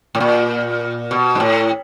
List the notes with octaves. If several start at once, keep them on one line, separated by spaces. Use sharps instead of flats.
A2
A#2
B2
G#2
A2